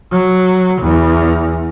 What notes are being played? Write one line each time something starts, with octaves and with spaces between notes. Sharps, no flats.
F#3
E2